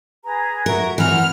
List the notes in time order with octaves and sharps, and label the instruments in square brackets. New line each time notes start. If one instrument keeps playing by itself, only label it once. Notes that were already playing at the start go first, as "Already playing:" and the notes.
[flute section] G#4 B4 A#5
[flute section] F#4 E5 A#5 [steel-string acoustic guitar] A#4
[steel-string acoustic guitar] E3 C4 [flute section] F#5 [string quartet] F6